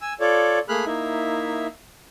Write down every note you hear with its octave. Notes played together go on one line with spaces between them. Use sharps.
G#5 E6
F4 A4 C#5 D5
A3 A#3 G#4 B5 F6 F#6
A#3 D#4 E4 E5